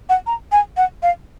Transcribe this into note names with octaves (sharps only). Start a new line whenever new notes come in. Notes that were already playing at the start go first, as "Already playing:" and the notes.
F#5
A#5
G#5
F#5
F5